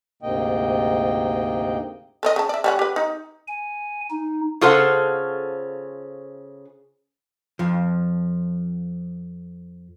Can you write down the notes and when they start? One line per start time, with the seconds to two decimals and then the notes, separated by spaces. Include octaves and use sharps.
0.23 D2 G#2 C3 A#3 D#5 G5
2.23 A4 C#5 D#5
2.36 C#3 A5
2.49 D5 E5
2.64 G3 C#4 F#5
2.79 G4 B4
2.96 D#4
3.47 G#5
4.10 D#4
4.61 C#3 F4 A4 C5 F#5
7.59 F2 F3